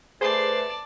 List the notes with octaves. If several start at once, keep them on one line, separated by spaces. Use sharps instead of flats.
A3 G#4 B4 C5 D5 A5 C7